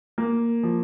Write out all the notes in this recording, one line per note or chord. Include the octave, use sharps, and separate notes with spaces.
A#3
F3